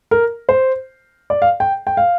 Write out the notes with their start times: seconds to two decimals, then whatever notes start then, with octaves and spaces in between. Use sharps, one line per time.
0.11 A#4
0.49 C5
1.30 D5
1.42 F5
1.60 G5
1.87 G5
1.97 F5